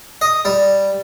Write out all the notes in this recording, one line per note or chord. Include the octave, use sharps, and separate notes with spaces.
D#5
G3